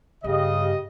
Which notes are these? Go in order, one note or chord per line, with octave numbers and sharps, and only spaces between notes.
G2 C#3 G4 D#5